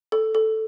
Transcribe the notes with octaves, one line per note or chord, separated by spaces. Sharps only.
A4
A4